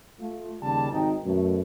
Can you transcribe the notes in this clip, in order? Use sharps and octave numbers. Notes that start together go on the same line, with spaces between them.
A3 F4
D#2 C#3 G3 A5
G#1 D#4 G5
F#2 B2 A3